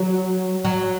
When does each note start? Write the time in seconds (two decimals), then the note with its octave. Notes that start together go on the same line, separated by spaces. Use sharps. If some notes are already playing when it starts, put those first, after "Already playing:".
Already playing: F#3
0.65 F#3